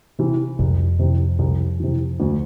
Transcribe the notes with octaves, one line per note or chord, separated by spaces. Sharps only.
C3 E3
C2 F2
C3 E3
C2
C3 E3
D2